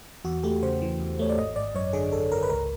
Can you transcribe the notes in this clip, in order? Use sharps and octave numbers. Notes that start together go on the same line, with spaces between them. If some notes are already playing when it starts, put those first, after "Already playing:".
E2 F#4
A3 G4
C#3 C5
E3
E2
A3 C#5
D5
G#1 D#5
G#1 D5
F#2 C#5
D3 G#4
G#1 A4
G#1 A#4
B4
C#2 A#4